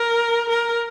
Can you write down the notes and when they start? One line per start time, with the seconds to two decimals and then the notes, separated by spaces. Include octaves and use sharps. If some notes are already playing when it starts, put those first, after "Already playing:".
Already playing: A#4
0.49 A#4